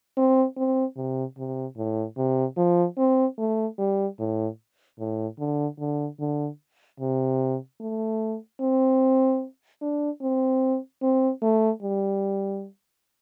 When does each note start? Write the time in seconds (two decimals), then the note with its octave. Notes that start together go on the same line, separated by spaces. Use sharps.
0.17 C4
0.57 C4
0.97 C3
1.38 C3
1.77 A2
2.17 C3
2.57 F3
2.98 C4
3.38 A3
3.78 G3
4.19 A2
4.99 A2
5.39 D3
5.79 D3
6.20 D3
7.00 C3
7.80 A3
8.61 C4
9.82 D4
10.21 C4
11.02 C4
11.42 A3
11.82 G3